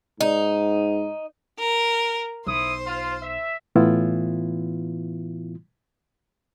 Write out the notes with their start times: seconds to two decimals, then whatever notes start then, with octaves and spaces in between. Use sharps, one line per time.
0.21 G#2 D#4
1.59 A#4
2.47 B1 E4 C5 D#6
2.87 F4
3.22 E5
3.75 A2 E3 B3 E4 F4